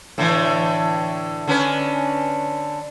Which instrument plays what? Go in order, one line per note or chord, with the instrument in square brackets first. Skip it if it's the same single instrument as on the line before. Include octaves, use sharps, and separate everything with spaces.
[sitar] A2 D3 E3
D3 C#4 B4